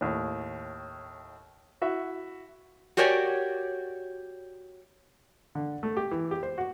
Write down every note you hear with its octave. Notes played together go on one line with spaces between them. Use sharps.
D#2 A2
E4 F#4 E5
F#4 G4 A#4 C#5 D5 G#5
D3
A3
G4
E3
G4
C5
F#4